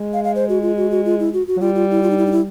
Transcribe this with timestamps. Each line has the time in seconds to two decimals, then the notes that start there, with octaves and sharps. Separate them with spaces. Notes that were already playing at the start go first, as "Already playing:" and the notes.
Already playing: G#3
0.13 F5
0.24 F5
0.35 C5
0.49 F#4
0.62 F4
0.77 F#4
0.91 F#4
1.05 F4
1.20 E4
1.33 F#4
1.47 F#4
1.57 F#3
1.61 G3 F4
1.75 F4
1.91 E4
2.03 F4
2.10 D#4
2.18 E4
2.26 D#4
2.32 E4